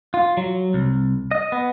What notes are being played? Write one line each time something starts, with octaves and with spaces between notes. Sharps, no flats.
F4
F#3
C2
D#5
B3